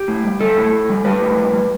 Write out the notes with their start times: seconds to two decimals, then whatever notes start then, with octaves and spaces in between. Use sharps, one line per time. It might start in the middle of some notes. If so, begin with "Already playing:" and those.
Already playing: G4
0.08 A2
0.24 G3
0.41 G3 A4
0.57 A2
0.73 A2
0.90 G3
1.05 G3 B4
1.21 A2
1.38 G3
1.54 G3